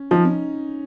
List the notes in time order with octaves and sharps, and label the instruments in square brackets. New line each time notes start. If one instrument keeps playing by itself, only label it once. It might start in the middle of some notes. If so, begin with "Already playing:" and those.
Already playing: [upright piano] C#4
[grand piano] F3 [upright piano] D#4
[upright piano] C#4